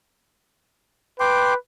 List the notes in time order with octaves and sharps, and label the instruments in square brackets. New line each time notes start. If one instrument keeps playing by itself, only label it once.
[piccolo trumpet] B4 [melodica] G5 C6 D6